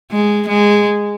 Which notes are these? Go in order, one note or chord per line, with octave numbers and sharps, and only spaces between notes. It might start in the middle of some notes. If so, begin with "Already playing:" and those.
G#3
G#3